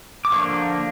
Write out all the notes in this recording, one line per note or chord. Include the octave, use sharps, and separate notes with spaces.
D6
D3 F3 A#3 D4 C#6